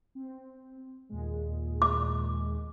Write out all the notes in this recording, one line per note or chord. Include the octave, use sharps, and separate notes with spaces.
C4
D#2 A#2 G#3
D6